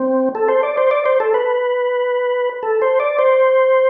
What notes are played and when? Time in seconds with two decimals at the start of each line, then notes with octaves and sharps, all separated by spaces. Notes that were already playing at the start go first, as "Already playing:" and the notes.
Already playing: C4
0.35 A4
0.48 C5
0.63 D5
0.77 C5
0.91 D5
1.06 C5
1.20 A4
1.34 B4
2.63 A4
2.82 C5
3.00 D5
3.19 C5